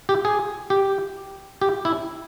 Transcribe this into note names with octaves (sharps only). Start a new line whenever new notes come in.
G4
G#4
G4
G4
E4